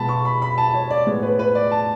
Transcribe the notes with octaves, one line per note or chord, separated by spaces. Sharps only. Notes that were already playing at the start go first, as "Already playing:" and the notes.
Already playing: B2 G#3 B3 A5 B5
C#6
B5
B5
A5
C#5
D5
A2 G#3 B3 C#5
B4
B4
D5
A5